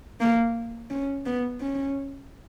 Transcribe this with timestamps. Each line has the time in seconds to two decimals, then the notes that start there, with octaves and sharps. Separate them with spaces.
0.20 A#3
0.90 C#4
1.26 B3
1.60 C#4